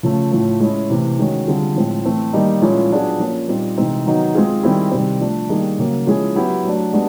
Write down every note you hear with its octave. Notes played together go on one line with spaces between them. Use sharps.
C#3 F3 A3
A2 F3 A3
G#3 C#4 E4
C3 E3 A3
D#3 G#3 C#4 F#4
D3 G3 C4 F4 G#4
A2 F3 G#3 C4
E3 A3 C4
D#3 G3 A#3 D#4
A#2 F3 G#3 C#4 E4
F#3 B3 D4 F4 G#4
F3 A#3 C#4
A#2 G3 C4 D#4
C3 E3 G#3 C4 D#4
D#3 F#3 B3 D#4
G#3 C4 F4 G#4
D#3 G3 C4 E4 G#4
C3 D#3 G3 C4
F3 A3 D4
D#3 G3 A#3 D#4 G#4
C#3 F#3 A#3
F3 G#3 C#4 E4 G#4
F#3 B3 E4 G4
F#3 A3 D4
G#3 B3 D4 G4